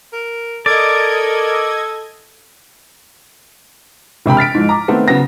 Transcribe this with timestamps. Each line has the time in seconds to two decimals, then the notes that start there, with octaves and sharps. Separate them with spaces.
0.13 A#4
0.66 A4 A#4 D5 D#5 G#6
4.26 E1 C3 G5 B5
4.37 F6 A6 B6 D7
4.54 G#2 F3 G#3
4.69 A#5 D6
4.88 D#3 A3 B3 C4 C5
5.08 C#3 F#3 B3 A#6